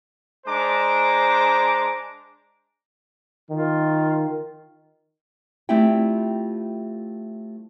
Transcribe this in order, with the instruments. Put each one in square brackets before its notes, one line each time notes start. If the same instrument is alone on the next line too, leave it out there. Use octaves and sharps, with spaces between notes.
[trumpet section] G#3 D4 C5 A#5 D6
[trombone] D#3 [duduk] F4
[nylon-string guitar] G3 A3 C4 E4 F4 G5